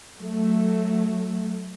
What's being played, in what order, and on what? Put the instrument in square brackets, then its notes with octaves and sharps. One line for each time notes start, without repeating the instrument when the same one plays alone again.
[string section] F#3 A3